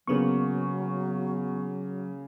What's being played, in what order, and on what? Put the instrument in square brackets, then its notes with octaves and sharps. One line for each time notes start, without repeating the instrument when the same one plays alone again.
[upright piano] C#3 A#3 [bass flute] F#3 [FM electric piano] B3 C#6